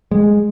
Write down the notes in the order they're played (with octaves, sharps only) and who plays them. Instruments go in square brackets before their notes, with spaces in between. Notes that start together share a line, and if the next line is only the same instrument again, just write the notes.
[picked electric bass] G#3